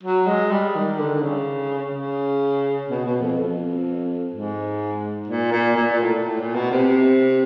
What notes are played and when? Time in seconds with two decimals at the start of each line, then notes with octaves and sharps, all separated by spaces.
0.03 F#3
0.27 G#3
0.51 G3
0.75 D#3
0.99 D3
1.15 D3
1.23 C#3
1.95 C#3
2.90 B2
3.05 B2
3.21 F2
3.37 F2
4.33 G#2
5.28 A#2
5.52 A#2
5.76 A#2
5.91 A#2
6.00 A2
6.24 A2
6.39 A#2
6.55 B2
6.71 C3